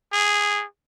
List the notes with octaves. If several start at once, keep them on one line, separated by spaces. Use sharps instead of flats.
G#4